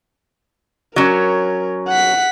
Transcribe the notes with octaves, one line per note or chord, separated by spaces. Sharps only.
F#3 C#4 A#4
F#5 B6